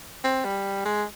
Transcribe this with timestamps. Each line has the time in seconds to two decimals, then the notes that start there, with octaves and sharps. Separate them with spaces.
0.24 C4
0.45 G3
0.85 G#3